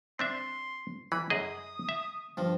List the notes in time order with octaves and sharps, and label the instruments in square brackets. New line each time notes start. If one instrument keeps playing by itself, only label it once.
[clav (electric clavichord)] C4 D4 E5 [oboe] C6
[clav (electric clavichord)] E3 [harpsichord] B5
[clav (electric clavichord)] F#2 G#4 D#5 [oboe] D#6
[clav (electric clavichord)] E5
[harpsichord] G2 F3